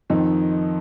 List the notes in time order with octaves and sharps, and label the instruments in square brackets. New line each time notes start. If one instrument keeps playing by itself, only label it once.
[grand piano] F2 D#3 C4 D#4